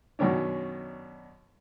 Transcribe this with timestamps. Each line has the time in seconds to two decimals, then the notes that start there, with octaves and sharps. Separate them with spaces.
0.19 F#2 B2 D#3 C#4 D4